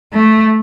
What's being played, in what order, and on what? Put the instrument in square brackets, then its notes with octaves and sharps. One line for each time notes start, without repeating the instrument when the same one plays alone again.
[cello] A3